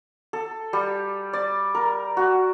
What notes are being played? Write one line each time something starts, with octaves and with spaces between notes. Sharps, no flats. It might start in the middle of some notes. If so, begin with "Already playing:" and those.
A4
G3
D5
A#4
F#4